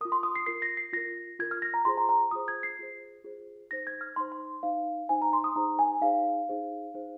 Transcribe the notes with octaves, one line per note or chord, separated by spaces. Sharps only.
F4 A#4 D#6
C6
D#6
C7
F4 A#4 C7
A#6
C7
F4 A#4 A#6
F4 A#4 G#6
F6
A#6
A#5
F4 G#4 C5 C6
A#5
A#5
F4 G#4 C5 D#6
G#6
C7
F4 G#4 C5
F4 G#4 C5
D#4 C5 A#6
G#6
F6
D#4 C5 C6
C6
D#4 C5 F5
D#4 C5 G#5
A#5
C6
D#6
D#4 G#4 C5 A#5
G#5
D#4 G#4 C5 F5
D#4 G#4 C5
D#4 G#4 C5